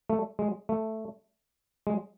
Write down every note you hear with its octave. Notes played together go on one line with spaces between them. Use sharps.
A3
G#3
A3
G#3